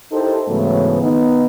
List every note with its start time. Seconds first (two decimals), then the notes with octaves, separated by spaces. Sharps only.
0.12 D#4 E4 G4 A4 A#4 C5
0.47 G#2 C#3 E3 F#3 A3 B3
1.01 D#3 B3 D#4